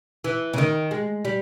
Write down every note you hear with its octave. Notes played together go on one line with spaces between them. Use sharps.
E3
C#3
D#3
G#3
G3